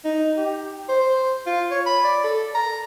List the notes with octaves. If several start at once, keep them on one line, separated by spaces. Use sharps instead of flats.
D#4
G4
C5
F4
C#5
B5
D5
A4
A#5